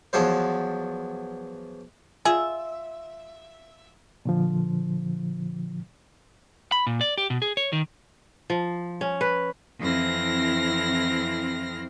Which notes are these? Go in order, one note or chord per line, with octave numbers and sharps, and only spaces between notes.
E2 F3 F#3 C5
F4 G#4 E5
A#2 D3 F3
B5
A#2
D5
G4
B2
G#4
C#5
D#3
F3
C#4
B4
F2 E3 C4 E4 F6 A#6